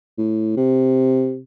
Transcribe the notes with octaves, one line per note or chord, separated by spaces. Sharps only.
A2
C3